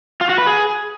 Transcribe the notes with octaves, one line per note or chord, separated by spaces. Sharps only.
F4
F#4
B4
G#4